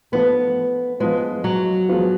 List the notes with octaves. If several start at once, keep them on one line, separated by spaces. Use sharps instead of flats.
F3 A3 B3 F4
F3 G#3 B3 F4 G#4 B4
F#3
F3 G#3 B3 F4 B4